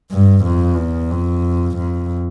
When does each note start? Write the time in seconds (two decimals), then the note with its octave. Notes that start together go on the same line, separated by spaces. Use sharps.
0.11 G2
0.44 F2
0.77 E2
1.11 F2
1.77 F2